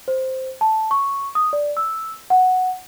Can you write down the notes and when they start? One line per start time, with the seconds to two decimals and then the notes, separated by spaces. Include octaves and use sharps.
0.08 C5
0.61 A5
0.91 C#6
1.35 D#6
1.53 D5
1.77 E6
2.30 F#5